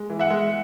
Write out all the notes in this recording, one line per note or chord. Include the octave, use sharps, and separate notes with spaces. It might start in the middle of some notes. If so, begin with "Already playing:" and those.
Already playing: G#3
E3
E5 F#5
G#3